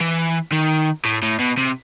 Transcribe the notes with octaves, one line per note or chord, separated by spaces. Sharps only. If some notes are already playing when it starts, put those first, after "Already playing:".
E3
D#3
A2
A2
B2
C3